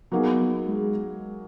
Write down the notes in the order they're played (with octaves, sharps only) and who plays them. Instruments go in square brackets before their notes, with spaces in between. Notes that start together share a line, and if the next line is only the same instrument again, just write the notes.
[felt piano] F#3 A#3 D#4 G#4 [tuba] B3
[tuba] G#3